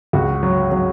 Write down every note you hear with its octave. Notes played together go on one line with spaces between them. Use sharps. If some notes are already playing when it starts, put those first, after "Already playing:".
C#2 F#4
F#3
F#3